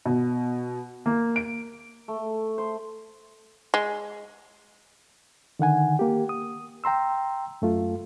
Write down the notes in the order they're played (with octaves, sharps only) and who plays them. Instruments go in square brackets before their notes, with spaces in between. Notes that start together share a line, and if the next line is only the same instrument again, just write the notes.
[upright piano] B2
A#3
D7
[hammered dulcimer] A3
C5
[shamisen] G#3
[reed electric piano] D3 D#3 F#5 G#5
A#3 G4
D#6
G5 A#5 C6 E6
F#2 A3 F4